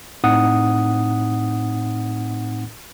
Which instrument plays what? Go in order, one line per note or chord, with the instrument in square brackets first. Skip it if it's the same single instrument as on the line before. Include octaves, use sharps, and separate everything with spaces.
[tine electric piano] A2 C4 D#4 F#5 D#6